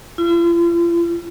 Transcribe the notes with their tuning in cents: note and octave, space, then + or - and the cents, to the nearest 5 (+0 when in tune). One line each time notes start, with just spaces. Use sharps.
F4 -45